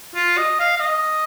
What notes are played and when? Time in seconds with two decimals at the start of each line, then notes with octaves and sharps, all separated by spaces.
0.15 F4
0.37 D#5
0.59 F5
0.76 F5
0.80 D#5